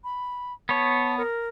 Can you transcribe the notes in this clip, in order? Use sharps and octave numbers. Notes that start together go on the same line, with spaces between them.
B5
B3 C#5 A5
A#4